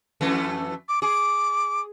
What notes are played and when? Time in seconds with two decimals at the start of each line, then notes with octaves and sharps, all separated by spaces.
0.21 F2 E3 A3
0.89 D6
1.02 G#4 D6